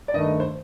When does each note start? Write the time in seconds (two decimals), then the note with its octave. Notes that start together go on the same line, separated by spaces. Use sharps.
0.08 D5
0.14 G2 D#3 A3 D#5
0.40 C5